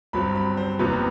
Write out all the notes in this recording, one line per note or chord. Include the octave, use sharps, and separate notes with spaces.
G1 G2 F#3 C4 B5
B5
C5
F#1 E2 C3 F#3 B3 B4